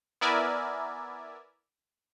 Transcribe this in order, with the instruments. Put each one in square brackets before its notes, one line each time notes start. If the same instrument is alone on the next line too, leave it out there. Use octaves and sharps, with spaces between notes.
[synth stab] B3 E4 A#4 D5 E5 G#5